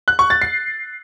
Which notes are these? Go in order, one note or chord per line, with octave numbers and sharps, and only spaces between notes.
F#6
C#6
A6
C7